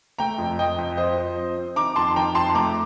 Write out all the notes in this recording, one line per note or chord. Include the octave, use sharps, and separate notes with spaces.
A3 G5 A#5
F2
F2 D#5 G5
F2
F3 C5 D#5
F3
C4
C4
D#3 A#5 D6
F2 A5 C6
D#3 G5 A#5
F2 A5 C6
A3 A#5 D6